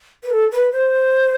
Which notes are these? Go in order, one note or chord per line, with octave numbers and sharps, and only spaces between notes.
B4
A4
B4
C5